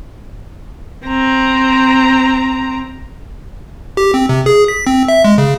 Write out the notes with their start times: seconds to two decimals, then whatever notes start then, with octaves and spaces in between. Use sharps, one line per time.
1.07 C4 A#5
3.97 G4
4.14 C4
4.29 C3
4.46 G#4
4.68 B6
4.87 C4
5.08 E5
5.25 G#3
5.38 C#3